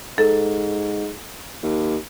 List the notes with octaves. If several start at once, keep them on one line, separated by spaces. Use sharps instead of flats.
G#2 A4
D#2